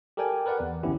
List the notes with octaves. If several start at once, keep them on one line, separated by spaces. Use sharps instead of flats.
G4 A4 A#4 D5 G5 G#5
A#4 B4 D5 F#5
E2
G1 C2 B3 C#4 E4 G4